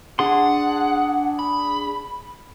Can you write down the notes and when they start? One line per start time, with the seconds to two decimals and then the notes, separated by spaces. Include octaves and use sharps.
0.19 D4 G#4 F#5 C6
1.39 B5